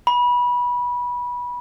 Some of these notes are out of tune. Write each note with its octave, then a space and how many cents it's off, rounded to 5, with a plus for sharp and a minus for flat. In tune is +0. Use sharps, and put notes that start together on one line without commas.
B5 -20